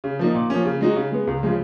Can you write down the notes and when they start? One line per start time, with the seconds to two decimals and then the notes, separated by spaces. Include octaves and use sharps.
0.04 C#3
0.19 F3 A#3 D#4
0.34 A#2
0.50 F3 A#3 C#4
0.65 C#3
0.81 G#3 D#4 F#4
0.96 C#3
1.12 G#3 B3
1.27 C#2
1.43 C#3 F3 G#3